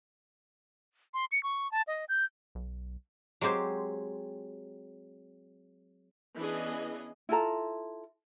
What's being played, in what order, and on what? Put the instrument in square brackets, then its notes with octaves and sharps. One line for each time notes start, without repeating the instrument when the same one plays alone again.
[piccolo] C6
C#7
C#6
A5
D#5
G6
[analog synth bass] B1
[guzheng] F#3 G#3 C4 G4 C5
[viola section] E3 B3 C#4 D4 G#4 D#5
[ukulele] E4 F4 A4 A#5